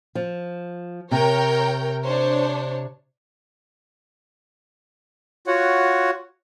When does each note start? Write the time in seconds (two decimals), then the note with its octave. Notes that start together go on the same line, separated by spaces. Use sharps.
0.15 F3
1.11 C3 A#4 C#5 G5
2.03 D4 C5 C#5
5.47 F4 F#4 C#5 F#5